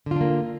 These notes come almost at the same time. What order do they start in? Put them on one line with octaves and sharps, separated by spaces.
D3 F4 D4 A#3